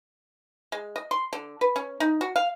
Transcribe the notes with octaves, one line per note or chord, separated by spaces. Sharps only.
G#3
D#5
C6
D3
B4
C#4
D#4
F#4
F5